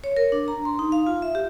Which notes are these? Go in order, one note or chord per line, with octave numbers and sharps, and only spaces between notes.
C#5
A#4
D4
A#5
C6
D#4
F5
F4
E5
G4